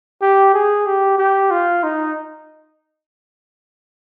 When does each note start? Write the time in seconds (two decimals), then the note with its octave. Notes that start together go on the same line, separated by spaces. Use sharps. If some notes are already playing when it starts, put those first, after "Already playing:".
0.21 G4
0.54 G#4
0.86 G4
1.18 G4
1.51 F4
1.83 D#4